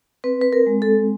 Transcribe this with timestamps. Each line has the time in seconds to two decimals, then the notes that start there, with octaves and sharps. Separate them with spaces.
0.24 C4 B4
0.41 B4
0.53 A#4
0.67 G#3
0.82 A4